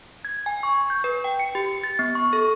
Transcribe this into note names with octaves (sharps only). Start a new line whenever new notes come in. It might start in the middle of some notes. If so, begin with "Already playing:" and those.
G#6
G#5
C#6
G6
B4
G5
C#7
G4
A6
B3
C#6
A4